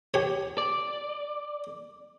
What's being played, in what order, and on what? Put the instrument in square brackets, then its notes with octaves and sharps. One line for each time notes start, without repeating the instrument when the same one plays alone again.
[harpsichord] G4 C#5
[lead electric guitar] D5